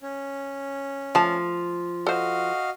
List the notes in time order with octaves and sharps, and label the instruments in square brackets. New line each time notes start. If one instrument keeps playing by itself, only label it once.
[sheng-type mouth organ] C#4
[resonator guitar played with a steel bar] F3 [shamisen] A3 A5
[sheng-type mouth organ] F#4 D#5 F5 [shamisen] A4 C5